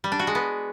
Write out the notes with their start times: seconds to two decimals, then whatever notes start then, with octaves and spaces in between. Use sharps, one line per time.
0.04 G3
0.12 D4
0.19 F#4
0.27 G#3
0.35 B3